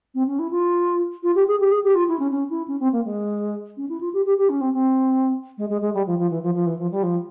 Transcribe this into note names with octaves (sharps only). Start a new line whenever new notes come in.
C4
C#4
E4
F4
F4
G4
G#4
G4
G#4
G4
F4
E4
C#4
C#4
E4
C#4
C4
A#3
G#3
C#4
E4
F4
G4
G4
G4
C#4
C4
C4
G#3
G#3
G#3
G3
F3
F3
E3
F3
F3
E3
F3
G3
F3